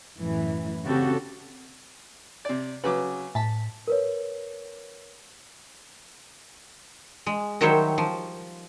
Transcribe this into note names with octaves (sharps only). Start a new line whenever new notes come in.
F#2 A2 E3
C#3 C4 F#4 G4 A4
C3 D5
C#3 F#3 B4 D6
A2 A5 B6
A#4 B4 C#5
G#3
D#3 F#3 G3 C5 C#5 E5
F3